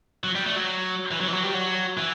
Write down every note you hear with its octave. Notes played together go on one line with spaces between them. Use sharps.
F#3
G3
A3
F#3
E3
F#3
E3
F#3
G3
F#3
E3